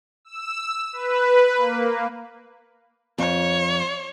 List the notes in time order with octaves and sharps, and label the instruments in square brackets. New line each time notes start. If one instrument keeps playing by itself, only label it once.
[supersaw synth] E6
B4
A#3
[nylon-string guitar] F2 [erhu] C#5